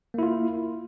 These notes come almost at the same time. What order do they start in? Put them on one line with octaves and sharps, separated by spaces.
A#3 E4 F4